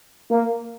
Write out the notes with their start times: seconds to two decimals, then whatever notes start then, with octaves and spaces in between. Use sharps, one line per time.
0.31 A#3